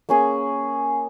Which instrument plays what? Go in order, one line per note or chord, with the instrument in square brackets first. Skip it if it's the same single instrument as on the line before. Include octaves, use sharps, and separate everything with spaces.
[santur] A#3 C#4 G#4